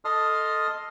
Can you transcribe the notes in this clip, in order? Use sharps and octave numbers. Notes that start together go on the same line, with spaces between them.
A4 D#5 A5 C6 D#6 F6